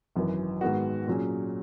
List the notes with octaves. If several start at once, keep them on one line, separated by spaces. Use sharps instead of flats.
G#1 F#2 E3
G#2 D#3 G#3 B3 F#4
A#2 F#3 C#4 G#4